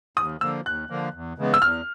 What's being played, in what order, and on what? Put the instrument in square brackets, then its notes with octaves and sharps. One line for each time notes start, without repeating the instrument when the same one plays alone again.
[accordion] D#2 [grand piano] D#6
[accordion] D3 F3 A#3 [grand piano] E6
[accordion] D#2 [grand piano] F#6
[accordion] D3 F3 A#3
E2
C#3 E3 G#3 B3
[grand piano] E6
[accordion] E2 [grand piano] F6